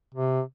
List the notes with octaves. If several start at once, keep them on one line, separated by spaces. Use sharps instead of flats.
C3